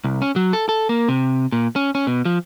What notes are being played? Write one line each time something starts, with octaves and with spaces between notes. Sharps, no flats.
C2
C#4
F#3
A4
A4
A#3
C3
A#2
C#4
C#4
B2
F3